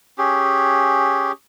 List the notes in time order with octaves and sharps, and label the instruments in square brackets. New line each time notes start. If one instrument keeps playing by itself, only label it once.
[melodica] C#4 G4 G#4